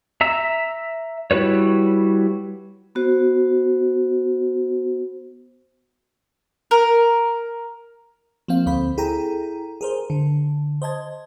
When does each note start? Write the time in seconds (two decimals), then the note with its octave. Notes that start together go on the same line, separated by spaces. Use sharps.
0.21 E5 A#5 E6
1.31 G3 E4 F#4 B4 C#5
2.95 B3 F#4 C5
6.71 A#4
8.48 F3 A#3 C4 F5
8.66 D2 C4 C5 B5
8.98 E4 G#4 A4 G5 A#5
9.81 G#4 A#4 C5
10.10 D3
10.82 C5 D#5 A5 G#6